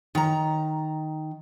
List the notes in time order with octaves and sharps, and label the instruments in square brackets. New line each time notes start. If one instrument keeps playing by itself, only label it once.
[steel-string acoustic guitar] D#3 A#5